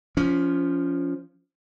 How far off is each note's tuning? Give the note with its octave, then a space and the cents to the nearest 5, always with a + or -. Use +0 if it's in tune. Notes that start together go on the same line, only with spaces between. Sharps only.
F3 -10 C#4 +20